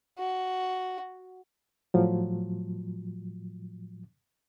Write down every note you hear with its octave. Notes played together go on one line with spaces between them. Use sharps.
F#4
A2 F3 F#3